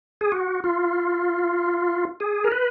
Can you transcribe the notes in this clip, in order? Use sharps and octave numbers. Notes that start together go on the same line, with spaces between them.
G#4
F#4
F4
G#4
A#4
B4